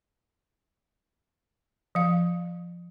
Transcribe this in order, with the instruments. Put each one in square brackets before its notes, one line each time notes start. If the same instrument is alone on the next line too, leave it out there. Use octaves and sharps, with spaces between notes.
[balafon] F3 F5